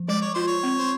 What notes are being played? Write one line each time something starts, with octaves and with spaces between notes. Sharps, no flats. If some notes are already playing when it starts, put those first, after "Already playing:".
Already playing: F3
G#3 D5
C#5
F4 C5
C#5
C4
C5